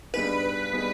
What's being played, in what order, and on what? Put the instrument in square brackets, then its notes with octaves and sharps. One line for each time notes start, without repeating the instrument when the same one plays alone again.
[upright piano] G2 G3 B3 D#4 G#4 [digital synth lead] B4
[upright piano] G3 B3 D#4 G#4